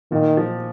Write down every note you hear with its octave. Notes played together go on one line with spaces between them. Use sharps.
A#2 D#3
F3